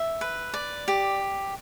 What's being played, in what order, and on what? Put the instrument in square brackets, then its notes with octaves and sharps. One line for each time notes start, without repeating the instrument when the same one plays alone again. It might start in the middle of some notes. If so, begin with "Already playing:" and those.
Already playing: [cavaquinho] E5
B4
D5
G4